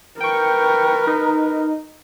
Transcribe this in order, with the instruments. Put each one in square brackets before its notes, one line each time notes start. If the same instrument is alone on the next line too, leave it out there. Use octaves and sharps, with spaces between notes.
[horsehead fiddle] A#4 B4 [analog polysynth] G5 C#6
[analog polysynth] D#4